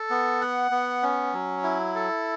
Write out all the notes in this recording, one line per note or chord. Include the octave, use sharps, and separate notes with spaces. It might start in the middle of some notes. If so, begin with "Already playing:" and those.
Already playing: A4
B3
F#5
B3
C#4
F#3
E4
A4